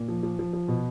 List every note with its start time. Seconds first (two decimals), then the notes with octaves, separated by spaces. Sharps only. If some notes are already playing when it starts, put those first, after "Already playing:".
Already playing: A#2
0.08 F3
0.23 F3
0.39 F3
0.53 F3
0.68 B2